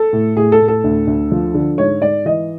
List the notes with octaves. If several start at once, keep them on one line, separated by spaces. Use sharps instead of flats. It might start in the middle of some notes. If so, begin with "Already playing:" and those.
Already playing: A4
A2
A2 G#4
A4
A2
A4
D2
D2
F3
D3
G#2 C#5
G#2 D5
E3 D#5